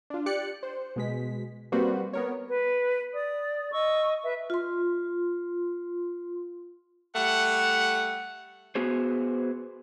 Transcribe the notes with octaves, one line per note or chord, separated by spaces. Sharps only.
D4 F4
G4 D5 F#6 C#7
C5
B2 G#3 B6
G3 A#3 C4 F#4 B4 C5
B3 A#4 C#5
B4
D5 D#6
D#5 C#6 E6
B4 E5
F4 C6
G3 A3 F#5
B3 F#4 G#4 C5